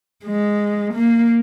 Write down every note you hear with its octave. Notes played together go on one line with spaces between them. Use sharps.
G#3
A#3